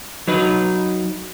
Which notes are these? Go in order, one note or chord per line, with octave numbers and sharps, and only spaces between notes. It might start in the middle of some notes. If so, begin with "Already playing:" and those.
F#3 D#4 B4